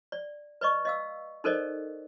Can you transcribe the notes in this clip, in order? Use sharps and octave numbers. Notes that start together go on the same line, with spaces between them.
D5
B4 D5 D#5 C#6
D#5 F5 E6
D#4 A4 A#4 C5 D5 D#5